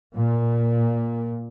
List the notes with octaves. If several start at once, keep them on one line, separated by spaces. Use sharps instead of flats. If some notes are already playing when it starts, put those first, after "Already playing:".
A#2